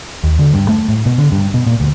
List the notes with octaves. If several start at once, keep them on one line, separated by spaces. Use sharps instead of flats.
D#2
D3
G2
A3
A2
B2
D3
G2
B2
A#2
D2